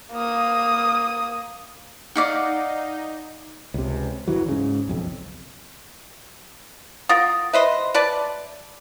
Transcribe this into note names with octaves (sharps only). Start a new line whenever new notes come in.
A#3 D#6
D#4 D5 F5 F#5
C#2 C3
F#1 C2 E3 F#3
G#2 C#3
F#1 B1 F2
F4 A#4 F#5 D#6 A6
B4 C5 D#5 E5
B4 D5 A5